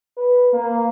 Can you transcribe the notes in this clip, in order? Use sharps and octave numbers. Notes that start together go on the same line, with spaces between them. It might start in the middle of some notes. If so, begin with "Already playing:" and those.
B4
A#3